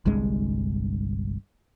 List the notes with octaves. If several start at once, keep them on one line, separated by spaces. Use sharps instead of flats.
G1 C2 G2 G#3